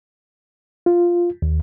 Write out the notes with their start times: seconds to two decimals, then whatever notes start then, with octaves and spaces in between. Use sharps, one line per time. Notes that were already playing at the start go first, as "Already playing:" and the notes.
0.86 F4
1.42 D#2